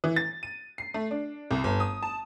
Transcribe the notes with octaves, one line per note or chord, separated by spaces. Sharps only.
E3
A6
D#7
C7
A3
D4
C2
G1
D#6
A5